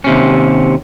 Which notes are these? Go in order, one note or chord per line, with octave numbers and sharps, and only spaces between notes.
D#2 C3 C#4